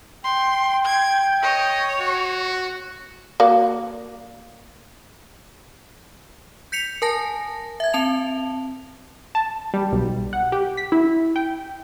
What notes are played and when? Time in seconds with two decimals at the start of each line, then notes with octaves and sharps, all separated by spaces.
0.24 G5 C6
0.85 G#6
1.43 C#5 D#5
2.01 F#4
3.40 A#3 F#4 D5
6.72 G6 B6 C#7 F7
7.02 A#4 G#5 A5 A#6
7.80 E5 G#6
7.94 C4 A5 F7
9.35 A5
9.74 G3
9.92 B1
10.33 F#5
10.52 G4
10.77 B6
10.92 E4
11.36 G5